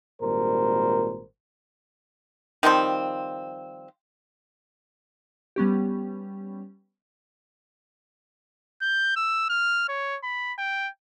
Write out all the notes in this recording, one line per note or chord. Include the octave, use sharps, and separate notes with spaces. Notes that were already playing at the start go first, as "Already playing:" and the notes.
G#1 A#2 G3 A#4 C5
D#3 F3 G3 C4
G3 B3 C#4 G4
G6
E6
F6
C#5
B5
G5